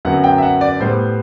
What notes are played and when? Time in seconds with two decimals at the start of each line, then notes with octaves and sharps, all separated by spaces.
0.05 F#2 D3 F#3 B3 F#5
0.24 G5
0.38 E5
0.42 F#5
0.61 D5
0.80 A2 G3 B3 C5